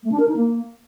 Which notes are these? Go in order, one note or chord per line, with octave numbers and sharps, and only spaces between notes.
A3
D4
A#4
D#4
A#3